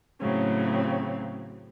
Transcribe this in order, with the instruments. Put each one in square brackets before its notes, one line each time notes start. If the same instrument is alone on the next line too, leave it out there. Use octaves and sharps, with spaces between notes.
[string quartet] A2 C#3 F#3 C4